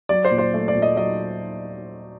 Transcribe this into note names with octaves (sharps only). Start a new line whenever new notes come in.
F#3 D5
C5
A#2
C5
A3
D5
A#2
D#5
F#3 D#5